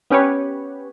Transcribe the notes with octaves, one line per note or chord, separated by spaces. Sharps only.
B3 C#4 G4 B4 C#5